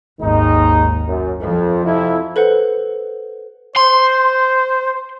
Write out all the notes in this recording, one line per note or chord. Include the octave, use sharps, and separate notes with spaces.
G#1 D#2 D#3 G#3 D#4
F#2
F2 F3
F2 C3 E4
A4 B4 C5 F#5
C5 C6